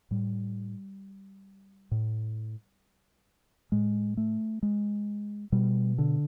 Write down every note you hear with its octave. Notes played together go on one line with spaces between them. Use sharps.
A2 G3
A2
A2 G#3
A3
G#3
B2 G3
D3